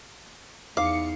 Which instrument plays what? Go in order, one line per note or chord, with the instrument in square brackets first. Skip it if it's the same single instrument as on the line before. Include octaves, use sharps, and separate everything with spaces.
[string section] E2 C#7 [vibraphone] D#4 [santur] F5 [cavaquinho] D6